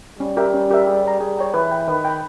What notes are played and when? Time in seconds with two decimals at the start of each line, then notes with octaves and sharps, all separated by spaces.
0.19 G3 C#4
0.37 G4 A#4 E5
0.54 C#4
0.70 G4 A#4 E5
0.87 G#4
1.04 C#5 G5 A#5
1.20 G3 G#4
1.37 C#5 G5 A#5
1.54 E3 B4
1.71 G5 B5
1.88 D#3 B4
2.05 G5 B5